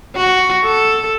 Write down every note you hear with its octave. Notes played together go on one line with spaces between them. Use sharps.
F#4
A4